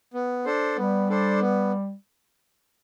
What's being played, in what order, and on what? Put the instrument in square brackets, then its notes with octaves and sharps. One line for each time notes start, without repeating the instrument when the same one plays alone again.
[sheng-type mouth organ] B3
D4 A4 C5
[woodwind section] G3 [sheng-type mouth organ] B3
[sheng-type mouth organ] D4 A4 C5
B3